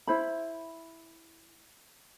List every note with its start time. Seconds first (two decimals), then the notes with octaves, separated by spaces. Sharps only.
0.07 E4 C5 B5